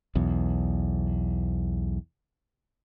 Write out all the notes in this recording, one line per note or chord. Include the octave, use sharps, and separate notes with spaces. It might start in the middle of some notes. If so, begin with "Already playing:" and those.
B1 E2